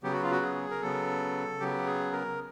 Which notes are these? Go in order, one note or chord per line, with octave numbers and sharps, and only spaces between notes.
C#3 F#3 B3 G4
F#4
F4
F#4
G#4
A#4
C#3 F#3 B3 A4
C#3 F#3 B3 G4
G#4
A#4